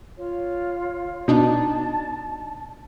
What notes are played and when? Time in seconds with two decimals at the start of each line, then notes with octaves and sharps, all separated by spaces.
0.17 F4 C#5
1.28 B2 D4 D#4 A5